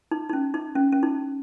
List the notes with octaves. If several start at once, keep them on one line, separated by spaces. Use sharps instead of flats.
D#4
D#4
C#4
D#4
C#4
C#4
D#4